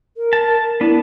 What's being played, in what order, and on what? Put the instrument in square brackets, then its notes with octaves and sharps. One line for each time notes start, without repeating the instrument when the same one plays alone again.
[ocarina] A#4
[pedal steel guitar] A5
[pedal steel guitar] B3 D4 [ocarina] E4